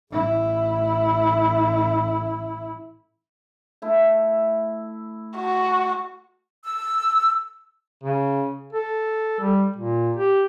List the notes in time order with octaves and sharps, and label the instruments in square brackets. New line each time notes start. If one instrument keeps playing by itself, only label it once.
[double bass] A1 E4
[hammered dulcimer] A3 E4
[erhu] F#4
[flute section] E6
[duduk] C#3
A4
G3
A#2
G4